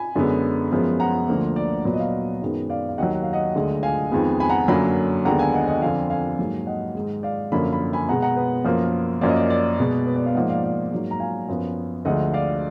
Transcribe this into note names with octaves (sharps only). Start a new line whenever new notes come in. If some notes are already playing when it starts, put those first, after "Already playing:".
Already playing: G#5 B5
F#2 D3 G#3 B3
F#2 F3 G#3 B3
F#5 A#5
D2 D3 F3 A#3
D5
A#2 F#3 B3 D5
D#5
D5 F5
F#2 D#3 G#3 B3
D5 F5
F5
D#2 D#3 F#3 D#5 F#5
F#5
F5
D#5 F#5
D2 D3 G#3
F5 G#5
F2 D#3 G#3 B3
G#5 B5
F#5 A#5
F#2 D3 F#3 A#3 G#5 B5
D#2 D3 G#3 B3 F#5 A#5
F5 G#5
D#5 F#5
D#5 F#5
F2 D3 F3 F5 G#5
F5 G#5
G#2 F#3 A#3
D#5 F#5
G#2 D#3 G#3
D5 F5
F#2 D3 F3 A#3 B5
B5
G#5 B5
B2 G#3 B3 F#5 A#5
F#5 A#5
B4
F#2 F3 A#3
F#2 F3 A#3 D5
D#5
D5
D5
B2 G#3 B3
B4
D5
D5 F5
G#2 F3 A#3 D#5 F#5
D5 F5
D5 F5
G#2 F#3 A#3
A#5
F5 G#5
F#2 F3 B3
D2 D3 F3 G#3 D#5 F#5
D5 F5